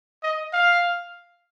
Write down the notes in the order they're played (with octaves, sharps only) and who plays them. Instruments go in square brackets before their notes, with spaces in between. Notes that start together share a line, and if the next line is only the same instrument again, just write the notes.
[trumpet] D#5
F5